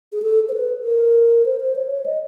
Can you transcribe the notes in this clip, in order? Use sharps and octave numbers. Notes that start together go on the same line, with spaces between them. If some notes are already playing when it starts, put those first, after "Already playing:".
G#4
A4
C5
B4
A#4
C5
C5
C#5
C#5
D#5